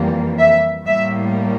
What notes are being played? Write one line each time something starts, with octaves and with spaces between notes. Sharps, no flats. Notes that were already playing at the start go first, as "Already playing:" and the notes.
Already playing: F2 E3 G3 A#3
E5
A2 G3 A#3 E5